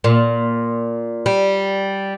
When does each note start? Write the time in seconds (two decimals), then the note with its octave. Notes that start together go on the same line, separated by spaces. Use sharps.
0.04 A#2
1.26 G3